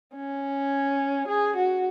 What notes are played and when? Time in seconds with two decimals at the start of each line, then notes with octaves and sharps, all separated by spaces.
0.16 C#4
1.27 G#4
1.56 F#4